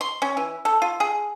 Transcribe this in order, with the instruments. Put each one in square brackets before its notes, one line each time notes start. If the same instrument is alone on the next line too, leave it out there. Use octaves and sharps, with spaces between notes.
[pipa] C6
C#4
E3
A4
F4
G#4